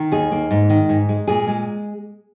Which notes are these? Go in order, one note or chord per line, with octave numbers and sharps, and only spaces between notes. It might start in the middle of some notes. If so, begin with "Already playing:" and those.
Already playing: D#3
D#2 G#4
A#3
G#2
D#3
G#2
G#3
A#2 G#4
G#3